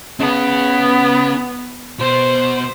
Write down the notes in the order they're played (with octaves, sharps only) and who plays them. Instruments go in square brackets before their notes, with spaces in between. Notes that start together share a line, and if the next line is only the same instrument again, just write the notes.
[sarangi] B3 [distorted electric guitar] C#4 G#4
[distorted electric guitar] B2 [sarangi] C5